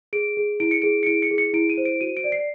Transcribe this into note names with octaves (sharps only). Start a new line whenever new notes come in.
G#4 D7
G#4
E4 D7
C#7
G#4 D7
C#7
E4 D7
C#7
G#4
C#7
E4 D7
D#7
C5
D7
F#4 D#7
D7
D5
C7